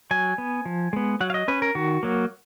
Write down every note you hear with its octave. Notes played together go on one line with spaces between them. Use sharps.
F#3 G#5
B3
F3
G#3 B3
F#3 F#5
F5
D#5
C#4 B4
A#4
D#3 F#4
F#3 A#3